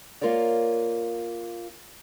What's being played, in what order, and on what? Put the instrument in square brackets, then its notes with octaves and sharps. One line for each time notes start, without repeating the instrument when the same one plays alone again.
[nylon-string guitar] A#3 F4 A#4 C#5 D5